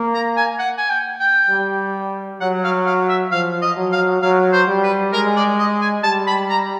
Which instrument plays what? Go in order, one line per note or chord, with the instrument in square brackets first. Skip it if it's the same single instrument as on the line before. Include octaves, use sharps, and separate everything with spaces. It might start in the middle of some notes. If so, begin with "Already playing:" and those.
Already playing: [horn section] A#3
[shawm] A#5
G#5
F#5
G#5
G5
G5
[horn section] G3
[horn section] F#3 [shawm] F#5
[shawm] F5
F5
E5
[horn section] F3 [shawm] F5
[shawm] D#5
[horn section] F#3
[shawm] F5
[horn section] F#3 [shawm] F5
[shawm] C5
[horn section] G3
[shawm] B4
[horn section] G#3 [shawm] A#4
[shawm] D5
D#5
G#5
[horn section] G3 [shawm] A5
[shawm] B5
A#5